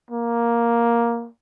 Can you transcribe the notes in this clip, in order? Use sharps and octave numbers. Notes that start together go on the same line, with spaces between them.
A#3